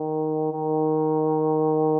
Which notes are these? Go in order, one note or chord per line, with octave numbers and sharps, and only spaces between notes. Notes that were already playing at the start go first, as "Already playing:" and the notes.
Already playing: D#3
D#3